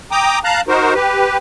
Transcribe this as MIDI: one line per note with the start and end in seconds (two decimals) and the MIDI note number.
0.11 0.39 79
0.11 0.39 82
0.11 0.39 86
0.11 0.39 87
0.44 0.61 77
0.44 0.61 81
0.44 0.61 82
0.44 0.61 90
0.68 0.94 63
0.68 0.94 66
0.68 0.94 70
0.68 0.94 72
0.95 1.37 67
0.95 1.37 71